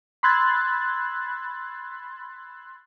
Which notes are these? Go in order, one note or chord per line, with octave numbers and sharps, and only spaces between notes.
B5 C6 E6 F#6 G#6 A6